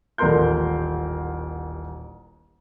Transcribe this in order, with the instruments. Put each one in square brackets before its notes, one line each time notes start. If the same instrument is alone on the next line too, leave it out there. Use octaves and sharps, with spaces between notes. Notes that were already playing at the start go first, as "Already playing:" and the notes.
[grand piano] D#1 A1 A3 A#4 C6 G6